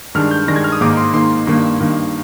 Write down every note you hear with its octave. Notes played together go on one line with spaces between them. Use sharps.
G2 D#3 G#3 D4 F6
G6
G2 D#3 G#3 D4 A#6
G#6
F6
D#6
G#2 D#3 A#3 D#4 D6
C6
G#2 D#3 A#3 D#4 C6
G2 D#3 A#3
G2 D#3 A#3